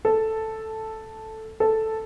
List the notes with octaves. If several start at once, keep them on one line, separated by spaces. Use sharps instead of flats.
A4
A4